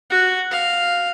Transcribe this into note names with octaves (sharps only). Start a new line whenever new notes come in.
F#4
F5